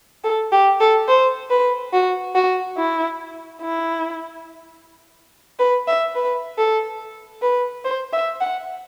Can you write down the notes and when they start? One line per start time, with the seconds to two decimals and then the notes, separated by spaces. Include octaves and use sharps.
0.24 A4
0.52 G4
0.80 A4
1.08 C5
1.51 B4
1.93 F#4
2.35 F#4
2.78 E4
3.62 E4
5.59 B4
5.88 E5
6.15 B4
6.58 A4
7.42 B4
7.85 C5
8.13 E5
8.41 F#5